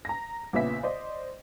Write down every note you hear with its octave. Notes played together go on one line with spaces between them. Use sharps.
A#5 A#6
A#1 A#2 C#3 B3 E5 B6
C5 D5 D#5